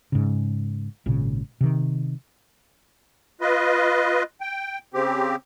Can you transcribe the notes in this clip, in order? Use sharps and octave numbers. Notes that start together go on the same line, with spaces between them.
G#2 C#3
G#1 A#2 C#3
C3 D#3
F4 B4 D#5
G5
C#3 C4 G4